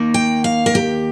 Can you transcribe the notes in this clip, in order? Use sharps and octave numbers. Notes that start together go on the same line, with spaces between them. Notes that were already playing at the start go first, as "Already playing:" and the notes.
Already playing: D#2 D#3 A#3
G5
F5
A#4
G4